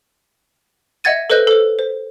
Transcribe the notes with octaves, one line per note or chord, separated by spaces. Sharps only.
D#5 E5 F#5 G#6 A6 D#7
A4 B4 C5 D#5 F#6 G6
A4 C5
C5